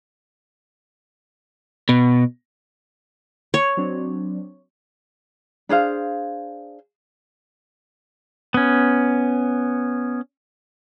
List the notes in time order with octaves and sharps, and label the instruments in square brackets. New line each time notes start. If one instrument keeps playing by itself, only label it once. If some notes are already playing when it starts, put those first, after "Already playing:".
[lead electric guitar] B2
[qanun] C#5
[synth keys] F#3 C4 D4
[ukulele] D4 G#4 C5 F5
[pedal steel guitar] B3 C#4